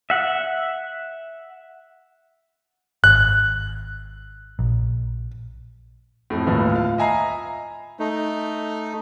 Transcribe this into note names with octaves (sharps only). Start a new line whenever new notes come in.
E5 F#5
G#1 F#6
A#1
F2 A2
G1 D#2 A2 F4 B4
F4 F5
D#5 E5 G#5 A#5 B5 C7
A3 D#4